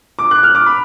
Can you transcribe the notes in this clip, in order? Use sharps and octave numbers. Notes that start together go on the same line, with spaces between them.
D6
F#6
F6
D6
B5